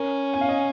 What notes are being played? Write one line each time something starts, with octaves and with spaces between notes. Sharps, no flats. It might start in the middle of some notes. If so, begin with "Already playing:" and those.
Already playing: C#4 A#4
G#5
F5
D#5